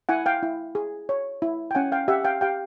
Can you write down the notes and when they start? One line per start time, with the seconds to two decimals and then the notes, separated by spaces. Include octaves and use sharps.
0.09 E4 F#5 G#5
0.26 F5 G5
0.43 E4
0.75 G#4
1.09 C#5
1.42 E4
1.71 G5
1.75 C#4 F#5 G#5
1.92 F5 G5
2.08 G4 E5 F#5
2.25 F5 G5
2.41 G4 F5 G5